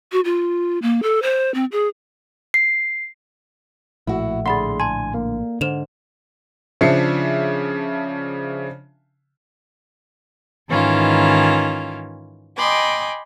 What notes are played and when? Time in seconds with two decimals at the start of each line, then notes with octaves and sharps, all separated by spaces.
0.12 F#4
0.25 F4
0.82 A#3
1.03 A4
1.22 C5
1.54 C4
1.72 G#4
2.54 C7
4.07 A#1 A2 E4 F#4
4.46 D3 G#4 F#5 B5 C6 A6
4.80 G#5 A5 C6
5.14 A#3
5.61 G#2 D3 C5 E7 F7
6.81 C#3 F3 D4 E5 C7 C#7
10.68 G#2 D#3 E3 C#4 E4 F4
12.57 D#5 G5 G#5 B5 C6 D6